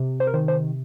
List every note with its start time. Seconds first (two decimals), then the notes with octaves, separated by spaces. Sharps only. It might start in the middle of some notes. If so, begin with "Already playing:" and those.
Already playing: C3
0.20 C5
0.27 A#4
0.34 D#3 C5
0.48 C5